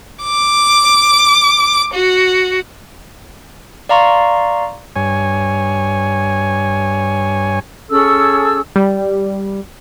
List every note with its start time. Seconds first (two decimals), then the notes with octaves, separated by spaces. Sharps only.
0.24 D6
1.94 F#4
3.89 D5 F5 A#5 C6 C#6
4.96 G2 C#5 G#5
7.90 C#4 G#4 A4 E6
8.76 G3